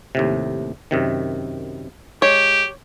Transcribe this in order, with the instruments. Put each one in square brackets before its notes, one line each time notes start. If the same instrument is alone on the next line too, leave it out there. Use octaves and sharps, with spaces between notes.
[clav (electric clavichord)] D#2 A2 C3
F#2 C3 D#3
[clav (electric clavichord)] G#3 [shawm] G4 [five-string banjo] C#5